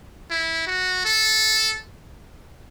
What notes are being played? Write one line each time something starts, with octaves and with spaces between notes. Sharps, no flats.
E4
F#4
A4